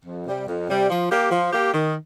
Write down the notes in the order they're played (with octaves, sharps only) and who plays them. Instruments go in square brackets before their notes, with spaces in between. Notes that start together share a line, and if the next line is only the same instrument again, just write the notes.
[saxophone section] F2
C3 G3
F2
C3 G3
F3
A#3 G4
F3
A#3 G4
D#3